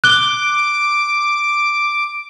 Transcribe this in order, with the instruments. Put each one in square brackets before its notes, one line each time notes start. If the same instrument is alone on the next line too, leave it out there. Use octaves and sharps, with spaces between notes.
[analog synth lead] D6 [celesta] F#6 G7